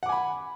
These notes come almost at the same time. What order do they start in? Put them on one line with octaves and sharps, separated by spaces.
F#5 D6 G#5 B5